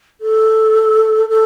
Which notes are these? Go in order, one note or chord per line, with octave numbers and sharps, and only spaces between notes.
A4
A4